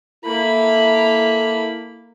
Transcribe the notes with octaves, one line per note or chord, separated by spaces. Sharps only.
A#3 E4 A4 B5